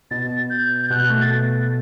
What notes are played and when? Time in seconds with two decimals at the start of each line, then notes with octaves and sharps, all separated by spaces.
0.11 B2 A6
0.50 G6
0.82 G6
0.90 B2 F#6
1.10 A3
1.21 A6